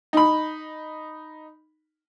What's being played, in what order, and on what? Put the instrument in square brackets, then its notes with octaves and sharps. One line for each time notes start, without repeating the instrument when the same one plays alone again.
[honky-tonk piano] D#4 B5